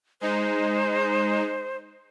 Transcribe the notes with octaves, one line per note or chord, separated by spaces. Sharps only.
G#3 D#4 C5